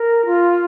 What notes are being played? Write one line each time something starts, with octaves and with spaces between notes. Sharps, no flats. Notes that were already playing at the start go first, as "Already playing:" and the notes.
Already playing: A#4
F4